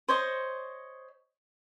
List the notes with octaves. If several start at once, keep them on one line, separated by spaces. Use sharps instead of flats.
C5 C#5 D#5